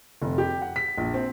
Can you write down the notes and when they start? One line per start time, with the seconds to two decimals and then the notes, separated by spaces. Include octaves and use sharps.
0.22 F1
0.38 G4
0.62 F#5
0.76 B6
0.98 A#1
1.14 C4